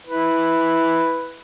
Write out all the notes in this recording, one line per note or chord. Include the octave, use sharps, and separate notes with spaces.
E4 B4